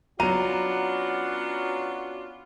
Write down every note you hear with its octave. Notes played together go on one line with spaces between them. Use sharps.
F#3 B3 C#4 D4 F4 F#4 A#5 D#7